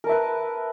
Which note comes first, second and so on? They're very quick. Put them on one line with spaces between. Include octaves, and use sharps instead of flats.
A#4 A5 E5 B4